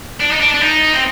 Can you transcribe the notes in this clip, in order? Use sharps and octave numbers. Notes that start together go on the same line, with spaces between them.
D4
D#4
D4
D4
D#4
C4